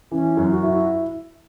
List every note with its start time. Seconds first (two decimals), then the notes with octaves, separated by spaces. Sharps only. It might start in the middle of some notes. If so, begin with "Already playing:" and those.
0.12 E3 C#4
0.37 F#2
0.51 F#4
0.63 E4